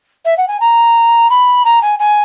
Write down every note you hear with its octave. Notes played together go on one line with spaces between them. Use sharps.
E5
F#5
G#5
A#5
B5
A#5
G#5
G#5